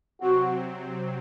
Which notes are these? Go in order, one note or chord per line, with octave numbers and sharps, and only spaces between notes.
C3 F#3 C4 F#4